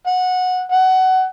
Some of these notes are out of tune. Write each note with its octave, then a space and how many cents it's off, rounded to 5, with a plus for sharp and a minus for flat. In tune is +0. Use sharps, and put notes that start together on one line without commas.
F#5 -15
F#5 +20